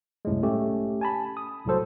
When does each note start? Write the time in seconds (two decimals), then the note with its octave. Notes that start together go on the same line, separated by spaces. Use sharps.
0.25 C2 F#2 A2 G3 G#3
0.43 A3 C#4 G4
1.01 G#5 A5 B5
1.37 D#6
1.66 C2 A2 F#3 F#4 A4 C5